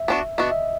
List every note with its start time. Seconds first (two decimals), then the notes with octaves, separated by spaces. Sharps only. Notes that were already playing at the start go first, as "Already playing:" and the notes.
Already playing: E5
0.08 B3 D4 F#4
0.38 B3 D4 F#4 D#5
0.51 E5